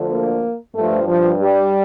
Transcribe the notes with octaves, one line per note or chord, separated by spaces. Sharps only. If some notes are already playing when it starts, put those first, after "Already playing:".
Already playing: D2 D3 F3
A#3
G2 F3 A3
F3
G3